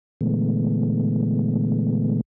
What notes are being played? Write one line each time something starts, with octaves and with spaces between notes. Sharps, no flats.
A#2 D3 E3 G#3 A3 B3